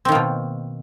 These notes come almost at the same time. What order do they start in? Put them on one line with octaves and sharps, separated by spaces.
C4 D#3 A#3 B2